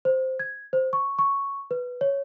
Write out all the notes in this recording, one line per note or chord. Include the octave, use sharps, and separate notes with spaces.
C5
G#6
C5
C#6
C#6
B4
C#5